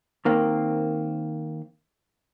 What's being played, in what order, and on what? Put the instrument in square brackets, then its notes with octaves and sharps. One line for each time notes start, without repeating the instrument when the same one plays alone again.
[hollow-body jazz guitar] D#3 A#3 C4